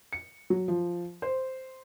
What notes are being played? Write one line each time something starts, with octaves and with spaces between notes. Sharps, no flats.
C#7
F#3
F3
C5